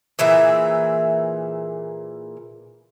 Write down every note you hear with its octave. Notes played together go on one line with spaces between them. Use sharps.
A#2 E3 G#4 E5